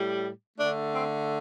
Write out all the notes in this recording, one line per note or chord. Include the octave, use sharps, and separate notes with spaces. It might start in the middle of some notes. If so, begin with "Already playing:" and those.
Already playing: A2 G3
D3 A3 D4
C4